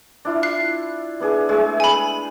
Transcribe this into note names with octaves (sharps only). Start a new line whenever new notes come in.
D4 E4 F4
F#6 C7
B3 D4 G#4
G#3 A3 G#4
G#5 B5